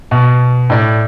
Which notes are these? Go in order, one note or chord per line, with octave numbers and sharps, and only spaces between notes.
B2
A2 D5